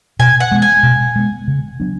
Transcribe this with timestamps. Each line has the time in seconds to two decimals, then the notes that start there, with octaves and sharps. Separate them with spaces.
0.19 B2 G#5
0.40 F#5
0.52 G#3 B3
0.62 G#5
0.83 B2
1.16 G#3 B3
1.48 C#3
1.80 F#3 B3 D4